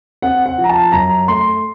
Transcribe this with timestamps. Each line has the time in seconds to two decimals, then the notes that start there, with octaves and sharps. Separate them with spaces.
0.22 C4 F#5
0.46 F#5
0.58 F3
0.64 A#5
0.69 A5
0.92 F#2 A#5
1.28 A3 C6